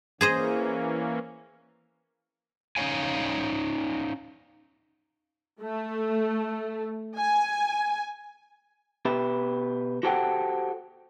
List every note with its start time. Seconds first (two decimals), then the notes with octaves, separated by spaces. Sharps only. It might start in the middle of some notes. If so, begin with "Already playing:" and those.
0.21 E3 A#3 C#4 G#4 C5 D#5
2.77 C#4 D#4 C5 C#5 F5 G#5
5.61 A3
7.16 G#5
9.05 B2 G4 B4 E5
10.03 F#4 G4 A4 C5 F#5 G5